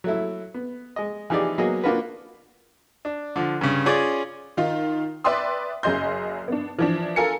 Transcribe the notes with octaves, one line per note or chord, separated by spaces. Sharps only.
F#3 A3 E4
B3
G#3 D#5
E3 F3 D#4 G4 G#4 D5
F#3 A#3 B3 F#4 G#4 D#5
A#3 D4 F4 F#4 A#4 B4
D4
D3 F3
G2 C#3
C#4 F4 G#4 D5
D#3 D#4 F4
B4 D5 E5 G5 C6 D#6
F#1 F#2 G#4 D#5 C6 G6
B3 D4
E3 F3 D4
F4 A4 A#4 G#5 C#7